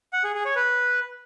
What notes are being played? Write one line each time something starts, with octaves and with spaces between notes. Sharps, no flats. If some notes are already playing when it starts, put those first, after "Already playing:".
F#5
G#4
G#4
C#5
B4